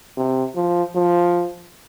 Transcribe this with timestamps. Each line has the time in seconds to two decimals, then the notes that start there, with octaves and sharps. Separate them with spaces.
0.17 C3
0.56 F3
0.95 F3